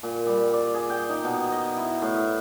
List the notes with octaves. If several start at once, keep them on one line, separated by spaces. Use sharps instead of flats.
A#2
G3
D5
G#4
G5
D#4
B2
D#5
E4
A2
E5